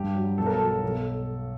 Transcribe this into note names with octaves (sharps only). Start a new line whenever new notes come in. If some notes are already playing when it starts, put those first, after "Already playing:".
Already playing: G2 G3 G4
F#3
B1 A4
A#4
A4
F#3
B1